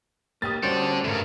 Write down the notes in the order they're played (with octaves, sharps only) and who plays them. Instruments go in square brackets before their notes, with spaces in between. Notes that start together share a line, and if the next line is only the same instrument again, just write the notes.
[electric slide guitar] A#3 G4 [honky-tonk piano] D#6 A6
[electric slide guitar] G3 C#4 F#4 [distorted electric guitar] A4 D5 [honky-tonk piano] C5
[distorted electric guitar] E2 G2 [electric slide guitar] A3 A#4